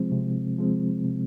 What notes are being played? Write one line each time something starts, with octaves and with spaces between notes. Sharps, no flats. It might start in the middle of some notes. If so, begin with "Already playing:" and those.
Already playing: C3 F3 G#3 C4
C3
F3 G#3 C4
C3